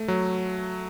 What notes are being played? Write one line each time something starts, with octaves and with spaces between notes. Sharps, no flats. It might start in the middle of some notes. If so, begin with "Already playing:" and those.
Already playing: A3
F#3